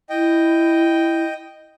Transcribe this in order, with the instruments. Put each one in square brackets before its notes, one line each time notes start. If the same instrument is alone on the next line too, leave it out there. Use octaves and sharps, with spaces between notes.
[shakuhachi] E4 [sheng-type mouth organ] D#5 G5